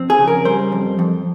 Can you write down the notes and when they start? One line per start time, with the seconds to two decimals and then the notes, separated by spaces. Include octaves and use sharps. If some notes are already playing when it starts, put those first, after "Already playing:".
Already playing: F2 C4
0.10 G#4
0.18 C#3
0.27 A#4
0.45 G3 C5
0.72 F2
0.99 F2